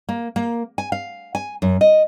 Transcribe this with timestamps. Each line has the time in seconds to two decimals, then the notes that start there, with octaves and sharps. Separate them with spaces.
0.09 A#3
0.36 A#3
0.78 G#5
0.92 F5
1.35 G#5
1.62 F#2
1.81 D#5